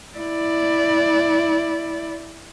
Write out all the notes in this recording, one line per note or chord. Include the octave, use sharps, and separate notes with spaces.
E4 D5